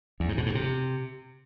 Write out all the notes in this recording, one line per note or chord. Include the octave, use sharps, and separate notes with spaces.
E2
G#2
B2
G#2
C3